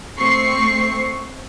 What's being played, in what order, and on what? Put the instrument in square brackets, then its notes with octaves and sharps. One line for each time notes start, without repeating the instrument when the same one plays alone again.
[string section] A3 C4 C#6 C7